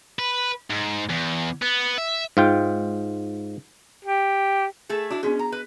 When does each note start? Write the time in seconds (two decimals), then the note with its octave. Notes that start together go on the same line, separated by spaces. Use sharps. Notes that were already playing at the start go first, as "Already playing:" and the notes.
0.19 B4
0.70 G#2
1.10 E2
1.62 B3
1.98 E5
2.37 G#2 F4 G5
4.04 G4
4.89 A3 G#4 A4
5.10 D4 E4 F#4
5.23 B3 C#4 D4 G#4
5.39 A#5
5.52 B4